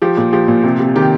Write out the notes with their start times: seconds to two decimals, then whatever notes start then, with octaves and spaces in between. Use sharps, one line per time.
0.02 F3 G4
0.17 A#2 G4
0.33 F3 G4
0.48 A#2
0.64 C3
0.80 C3
0.96 D#3 G4